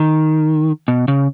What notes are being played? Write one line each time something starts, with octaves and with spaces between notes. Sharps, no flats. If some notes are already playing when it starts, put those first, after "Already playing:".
Already playing: D#3
B2
C#3